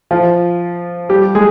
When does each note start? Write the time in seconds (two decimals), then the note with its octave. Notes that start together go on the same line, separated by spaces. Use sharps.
0.11 F3 F4
1.09 G3 G4
1.35 G#3 G#4